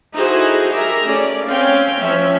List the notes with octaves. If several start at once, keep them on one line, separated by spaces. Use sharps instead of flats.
D#4 E4 F#4 G#4 A4 C5
G4 G#4 A#4 E5 A#5
A3 C#4 D5
C4 C#4 F5 G5
F3 C#4 E5